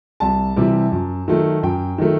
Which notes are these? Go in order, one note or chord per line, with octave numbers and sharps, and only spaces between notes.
C2 A5
C3 E3 G3
F#2
D#3 F#3 A3
F#2 G5
D#3 F#3 A3